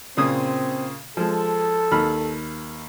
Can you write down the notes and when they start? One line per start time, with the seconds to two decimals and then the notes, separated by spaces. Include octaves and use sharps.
0.17 A#2 C#3 C4 D#6
1.17 F3 G#3 A4
1.92 D#2 B5 F6